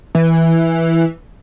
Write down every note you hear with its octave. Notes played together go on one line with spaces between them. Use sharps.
E3